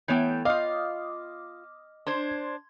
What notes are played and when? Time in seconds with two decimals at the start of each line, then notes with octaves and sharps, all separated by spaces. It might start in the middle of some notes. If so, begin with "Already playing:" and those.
0.08 E3 A3 B3 C#5 G5 G6
0.45 F4 D#5 F5 D6 D#6 F6
2.07 D4 C5 C6 G#6